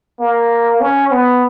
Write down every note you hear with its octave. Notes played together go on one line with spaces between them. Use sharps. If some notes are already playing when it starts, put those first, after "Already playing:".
A#3
C#4
B3